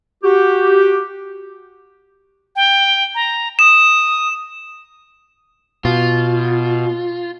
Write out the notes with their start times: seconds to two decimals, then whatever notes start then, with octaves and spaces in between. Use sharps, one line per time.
0.24 F#4 G4
2.56 G5
3.15 A#5
3.59 D#6 E7
5.85 B2 F4